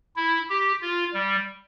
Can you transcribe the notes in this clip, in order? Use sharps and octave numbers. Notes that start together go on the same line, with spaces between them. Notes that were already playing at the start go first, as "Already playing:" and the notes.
E4
G4
F4
G3